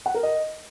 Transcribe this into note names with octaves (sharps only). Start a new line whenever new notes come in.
F#5
A#4
D#5